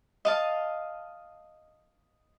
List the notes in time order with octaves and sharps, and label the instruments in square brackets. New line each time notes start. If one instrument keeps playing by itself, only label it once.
[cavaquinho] D#5 F5 A5